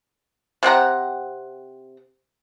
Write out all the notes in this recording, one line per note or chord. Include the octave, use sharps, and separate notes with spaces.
C3 C4 F#5 A#5